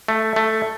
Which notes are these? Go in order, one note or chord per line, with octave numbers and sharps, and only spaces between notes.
A3
A3